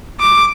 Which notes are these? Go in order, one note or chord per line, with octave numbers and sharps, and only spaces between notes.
D6